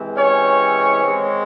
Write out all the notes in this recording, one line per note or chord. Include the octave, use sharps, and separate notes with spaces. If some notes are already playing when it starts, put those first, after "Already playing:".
Already playing: C3 E3 G#3 C4
C#4 C#5
D#3 G#3 C4